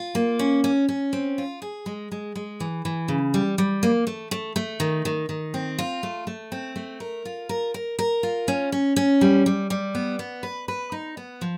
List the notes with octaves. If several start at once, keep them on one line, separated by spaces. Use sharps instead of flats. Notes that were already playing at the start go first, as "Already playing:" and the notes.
Already playing: F4
A#3
C#4
C#4
C#4
C4
F4
G#4
G#3
G#3
G#3
E3
E3
C#3
G3
G3
A#3
A3
A3
A3
D#3
D#3
D#3
C4
F4
A3
A3
C4
A3
A#4
F4
A#4
A#4
A#4
F4
C#4
C#4
C#4
G3
G3
G3
B3
B3
B4
B4
D#4
B3
F3